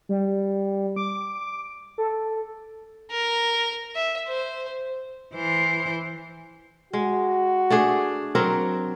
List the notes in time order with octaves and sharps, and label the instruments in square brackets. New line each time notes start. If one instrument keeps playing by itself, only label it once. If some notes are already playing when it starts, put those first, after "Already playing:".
[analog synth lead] G3
D6
A4
[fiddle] A#4
E5
C5
[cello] E3 C5
[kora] G#3 [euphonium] F#4
[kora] A3 D4 G#4
F#3 C4 A#4